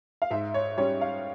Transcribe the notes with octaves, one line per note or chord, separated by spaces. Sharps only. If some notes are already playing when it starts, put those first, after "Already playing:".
F5
G#2 E5
C#5
G3 C#4 C#5
F5